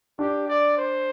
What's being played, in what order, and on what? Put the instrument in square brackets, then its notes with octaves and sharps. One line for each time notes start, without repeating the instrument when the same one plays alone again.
[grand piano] D4 [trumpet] G4
[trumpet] D5
C5